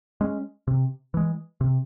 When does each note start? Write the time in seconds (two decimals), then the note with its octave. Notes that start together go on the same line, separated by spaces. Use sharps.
0.21 G#3 C#4
0.67 C3
1.14 E3 G#3
1.61 C3